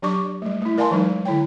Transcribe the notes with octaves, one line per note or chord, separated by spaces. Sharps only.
F#3 D4 G4 D5 C#6 D6
G3 A3
A3 E4
A#4 D5 F5 G#5 A5 C6
E3 F#3 G#3 D#4
D3 E4 C#5 G5